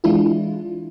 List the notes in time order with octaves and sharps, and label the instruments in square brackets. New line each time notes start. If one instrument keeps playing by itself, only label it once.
[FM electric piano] E3 G#3 D4 E4 F4